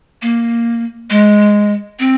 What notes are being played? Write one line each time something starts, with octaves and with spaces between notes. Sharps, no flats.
A#3
G#3
C4